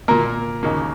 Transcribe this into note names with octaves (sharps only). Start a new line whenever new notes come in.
A#2 A#3 A#4
D#2 C#3 A#3